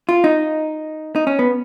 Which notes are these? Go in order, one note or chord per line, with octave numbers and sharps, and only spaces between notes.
F4
D#4
D#4
C#4
B3